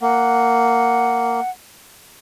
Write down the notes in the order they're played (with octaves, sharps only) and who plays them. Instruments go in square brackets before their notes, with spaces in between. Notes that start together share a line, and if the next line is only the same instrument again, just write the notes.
[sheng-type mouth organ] A#3 [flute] F#5